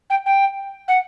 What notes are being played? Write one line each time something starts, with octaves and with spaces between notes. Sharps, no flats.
G5
G5
F#5